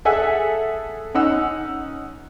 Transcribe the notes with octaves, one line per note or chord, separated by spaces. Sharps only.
G#4 A4 E5 F#5 G#5
C#4 D#4 F#5 E6